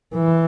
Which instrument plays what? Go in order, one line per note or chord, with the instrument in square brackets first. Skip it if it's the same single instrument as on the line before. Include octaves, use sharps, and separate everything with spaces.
[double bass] E3